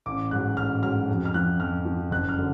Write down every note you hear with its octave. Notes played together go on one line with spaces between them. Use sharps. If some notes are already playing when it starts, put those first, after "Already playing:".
A1 D6
G#2 F#3 F#6
A1 F6
G#2 F#3 F6
F2
F6
F3 F#6
F2 F6
F3
F#1 F#6
F6
D3 F#3